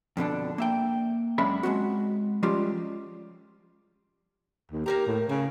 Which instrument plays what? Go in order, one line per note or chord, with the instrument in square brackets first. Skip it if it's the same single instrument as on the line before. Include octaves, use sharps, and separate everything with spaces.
[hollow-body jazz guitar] F2 B2 D3 D4
A#3 E5 G5
F#2 G#3 C#4 D4 E5 B5
G#3 A#3 C4 F#4
F3 G3 G#3 C#4 F4 G4
[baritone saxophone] D#2
[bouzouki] A#3 A#4 A#5 [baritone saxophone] G4
[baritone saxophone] A2
[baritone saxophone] C#3 [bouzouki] A#3